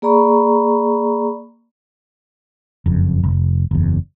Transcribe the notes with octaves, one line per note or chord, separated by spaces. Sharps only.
A#3 G#4 D5 A#5 B5 C#6
F#1 F2
F1
F#1 E2